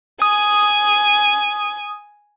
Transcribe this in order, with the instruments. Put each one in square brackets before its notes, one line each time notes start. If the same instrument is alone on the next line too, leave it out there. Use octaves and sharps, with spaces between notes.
[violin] G#5 [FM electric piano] D#6